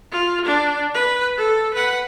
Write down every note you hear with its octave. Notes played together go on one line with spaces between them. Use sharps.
F4
D4
B4
A4
B4 F#5